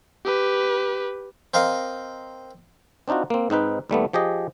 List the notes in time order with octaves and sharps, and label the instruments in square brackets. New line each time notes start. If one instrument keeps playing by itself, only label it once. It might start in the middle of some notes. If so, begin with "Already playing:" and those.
[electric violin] G4 B4
[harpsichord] C4 A#4 D#5 F5
[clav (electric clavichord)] C4 D4 D#4 F4 F#4
A#3 C4
G#2 C4 D#4 B4
D#2 G3 A3 B3
F3 G4 G#4 D#5